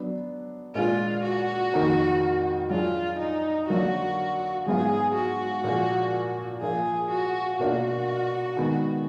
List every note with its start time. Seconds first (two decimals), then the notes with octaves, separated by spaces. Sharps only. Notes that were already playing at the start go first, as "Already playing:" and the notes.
Already playing: F#3 B3 D4
0.75 A#2 G#3 D4 F4 G#4 B4
1.24 F#4
1.74 F2 D#3 A#3 D#4 A#4
2.70 F#3 D4 F4 G#4
3.19 D#4
3.69 D3 F#3 A#3 D4 F4 F#4
4.66 G#2 F#3 B3 F4 G#4
5.15 F#4
5.64 A#2 F3 A#3 F4 G#4
6.61 F3 A#3 F4 G#4
7.11 F#4
7.59 B2 A#3 D4 F4 F#4
8.57 D#3 G#3 B3